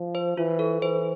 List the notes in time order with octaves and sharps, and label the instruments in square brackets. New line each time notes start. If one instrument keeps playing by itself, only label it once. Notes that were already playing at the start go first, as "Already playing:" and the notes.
Already playing: [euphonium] F3
[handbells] C5
[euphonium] E3 [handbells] F4
[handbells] A4
[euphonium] E3 [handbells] C5